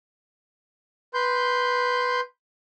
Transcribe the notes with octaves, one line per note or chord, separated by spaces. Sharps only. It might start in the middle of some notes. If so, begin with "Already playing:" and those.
B4 C6 G6